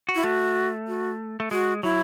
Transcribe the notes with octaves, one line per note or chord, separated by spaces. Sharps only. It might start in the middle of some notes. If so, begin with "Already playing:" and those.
F#4
E4
A3 F#4
F#4
A3
G#3 F#4
F#3 E4